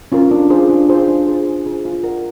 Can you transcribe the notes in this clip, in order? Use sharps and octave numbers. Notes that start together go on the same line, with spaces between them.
C#4 F4 A#4
D4
F4 G#4 C5
D4
F4 G#4 C5
D4
F4 G#4 C5
D4
F4 G#4 C5
F4
A#4 D5 F#5